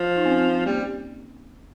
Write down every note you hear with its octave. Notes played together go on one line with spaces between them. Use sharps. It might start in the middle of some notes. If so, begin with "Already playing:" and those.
Already playing: F3
D#4
C4
C#4
C4
C#4
G3 A#3